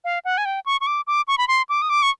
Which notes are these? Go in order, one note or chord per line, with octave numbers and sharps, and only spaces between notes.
F5
F#5
G#5
G5
C#6
C#6
D6
D6
C#6
B5
C6
D6
D#6
D6
C#6